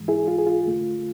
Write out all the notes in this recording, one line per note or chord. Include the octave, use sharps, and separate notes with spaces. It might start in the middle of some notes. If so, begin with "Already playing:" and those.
Already playing: G#2 E3 G#3
E4 G#4
F4
G#4
F4
F2 D3 A3